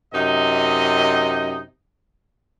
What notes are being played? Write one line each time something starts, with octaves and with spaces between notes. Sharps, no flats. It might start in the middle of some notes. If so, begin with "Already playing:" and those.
F#2 C3 D#4 D#5